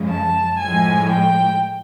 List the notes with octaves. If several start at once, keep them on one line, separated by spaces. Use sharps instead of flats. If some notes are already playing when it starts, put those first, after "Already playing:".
Already playing: F#2 C#3 F3 G#3
A5
A2 F3 G#3 G#5
G5